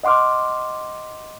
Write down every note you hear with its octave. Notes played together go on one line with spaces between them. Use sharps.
D#5 F#5 C6 D6 F6